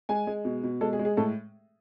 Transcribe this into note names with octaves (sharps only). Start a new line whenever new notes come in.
G#3 G#5
G#3
B2
B2
G#3 A4
G#4
G#3
G#4
A2 A4